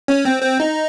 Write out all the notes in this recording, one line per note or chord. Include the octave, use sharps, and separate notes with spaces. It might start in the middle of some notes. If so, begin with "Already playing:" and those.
C#4
C4
C4
D#4